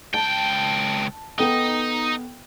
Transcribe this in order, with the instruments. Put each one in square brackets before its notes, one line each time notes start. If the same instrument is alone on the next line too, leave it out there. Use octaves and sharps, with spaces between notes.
[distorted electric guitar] C#2 G5 [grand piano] A5
[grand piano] B3 A4 G5 [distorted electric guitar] D#4